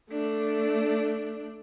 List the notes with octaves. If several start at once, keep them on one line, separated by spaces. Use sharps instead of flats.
A3 D4